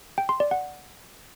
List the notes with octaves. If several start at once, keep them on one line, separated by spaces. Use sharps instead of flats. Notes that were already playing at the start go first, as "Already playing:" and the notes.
G5
C6
D5
F#5